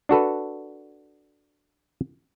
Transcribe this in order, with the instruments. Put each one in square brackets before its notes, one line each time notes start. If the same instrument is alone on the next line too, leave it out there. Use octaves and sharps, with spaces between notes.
[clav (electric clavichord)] D4 F#4 A4 B4